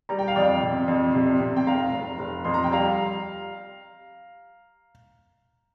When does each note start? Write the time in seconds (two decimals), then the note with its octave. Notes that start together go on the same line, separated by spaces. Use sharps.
0.09 G3 A#5
0.19 G5
0.28 F5
0.36 F2 D5 G5
0.62 C3
0.88 F2
1.15 C3
1.40 C3
1.56 G5
1.66 F1 F5 A#5
1.93 F1
2.19 F1
2.45 F2 C6
2.54 A#5
2.64 G5
2.72 G3 F5 A#5